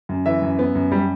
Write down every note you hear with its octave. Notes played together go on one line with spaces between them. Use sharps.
F#2
E3 E5
F#2
B3
F#2
G3